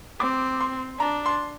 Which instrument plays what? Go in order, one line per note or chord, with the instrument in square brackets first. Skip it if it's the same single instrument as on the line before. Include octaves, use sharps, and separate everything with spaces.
[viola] C4 [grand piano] D6
[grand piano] C6
[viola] D4 [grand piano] A#5
[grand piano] C6